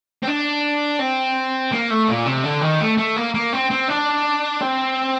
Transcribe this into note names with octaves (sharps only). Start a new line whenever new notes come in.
C4
D4
C4
A#3
A3
A#2
C3
D3
D#3
A3
A3
A#3
A#3
C4
C4
D4
C4